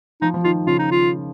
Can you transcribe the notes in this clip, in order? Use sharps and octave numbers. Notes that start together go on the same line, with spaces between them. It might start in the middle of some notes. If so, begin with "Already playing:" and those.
F3 D#4
F3
D#3 F4
C#3 F4
D#4
F4